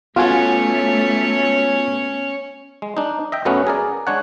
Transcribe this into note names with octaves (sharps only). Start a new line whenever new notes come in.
A3 B3 C#4 F4 F#4 A4 C#5 G#5
G#3
D4 D#4
D#5 E5 G5
F#2 F#3 A3 B3 C#4 F#5
G#4 A#4 D5
G#3 D4 C#5 F#5